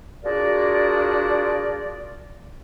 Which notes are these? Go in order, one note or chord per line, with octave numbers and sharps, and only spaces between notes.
D4 F4 F#4 G#4 A#4 D5